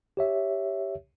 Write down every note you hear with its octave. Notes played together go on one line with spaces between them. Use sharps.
G4 C#5 E5